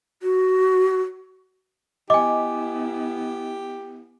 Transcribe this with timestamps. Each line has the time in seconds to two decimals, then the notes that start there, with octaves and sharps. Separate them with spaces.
0.23 F#4
2.10 B3 E4 G4 D#5 G#5 D6